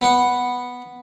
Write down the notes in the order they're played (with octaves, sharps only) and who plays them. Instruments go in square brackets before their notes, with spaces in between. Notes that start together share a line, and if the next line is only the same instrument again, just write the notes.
[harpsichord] B3 F#5